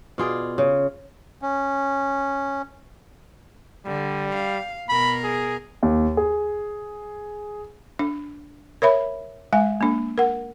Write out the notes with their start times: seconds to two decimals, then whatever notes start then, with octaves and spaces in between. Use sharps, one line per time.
0.18 B2 F4 G#4 D5
0.58 C#3
1.42 C#4
3.86 D3 G3
4.35 F5
4.89 B2 A#4 B5
5.24 G#4
5.83 D#2
6.17 G#4
7.99 D4
8.82 A#4 C#5 E5 B5
9.53 G#3 E5 G#5
9.81 A#3 D4
10.18 A#4 F#5